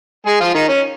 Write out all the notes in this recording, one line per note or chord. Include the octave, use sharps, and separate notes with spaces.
G#3 G#4
F3 F4
D#3 D#4
C#4